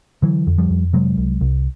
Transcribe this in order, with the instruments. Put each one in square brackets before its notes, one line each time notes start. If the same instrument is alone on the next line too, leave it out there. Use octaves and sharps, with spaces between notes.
[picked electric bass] D3 E3 F#3
F2
F3 G3
F2
C3 F#3 G#3
C2
C2